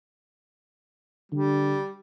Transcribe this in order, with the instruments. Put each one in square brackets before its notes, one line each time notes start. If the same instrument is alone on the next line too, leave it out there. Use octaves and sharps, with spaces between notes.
[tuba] D3 [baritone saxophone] G3